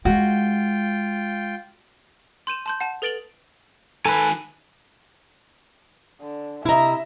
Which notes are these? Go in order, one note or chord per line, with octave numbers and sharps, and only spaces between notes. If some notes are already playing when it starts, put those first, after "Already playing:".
G#3 F4 F#4 G5
C6 G6 D#7 E7
A5 C6 G6
F#5 A5
A4 B4 A6 D7 F7 F#7
D#3 A4 B4 G#5
D3
C3 E4 D#5 E5 A#5